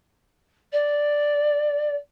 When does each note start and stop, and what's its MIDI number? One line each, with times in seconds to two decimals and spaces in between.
0.72 1.95 74